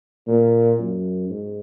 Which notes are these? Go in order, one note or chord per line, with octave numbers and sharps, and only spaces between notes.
A#2
F#2
G#2